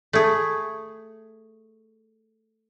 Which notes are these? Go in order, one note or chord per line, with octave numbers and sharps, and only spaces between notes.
A3 G#4